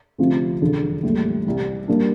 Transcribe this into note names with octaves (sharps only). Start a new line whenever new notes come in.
D2 C3 F3 C4 F4
E1 E2 D3 F3
A#1 A2 G3
C2 C3 E3
A#2 G3 A#3 D4